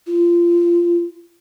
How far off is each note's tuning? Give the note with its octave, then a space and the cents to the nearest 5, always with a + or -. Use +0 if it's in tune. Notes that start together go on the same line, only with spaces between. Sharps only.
F4 -20